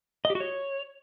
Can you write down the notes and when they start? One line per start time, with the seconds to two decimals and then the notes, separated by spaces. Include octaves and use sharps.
0.25 D#5
0.30 G4
0.35 F#4
0.40 C#5